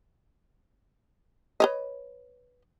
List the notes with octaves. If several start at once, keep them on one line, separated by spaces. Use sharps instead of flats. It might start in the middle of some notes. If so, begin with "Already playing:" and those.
B4 C#5 D#5